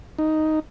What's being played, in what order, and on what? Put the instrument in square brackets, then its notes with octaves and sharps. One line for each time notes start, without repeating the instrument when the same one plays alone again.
[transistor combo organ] D#4